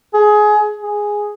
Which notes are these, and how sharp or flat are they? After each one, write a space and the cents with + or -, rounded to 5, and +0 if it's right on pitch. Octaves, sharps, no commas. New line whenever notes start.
G#4 +20
G#4 -5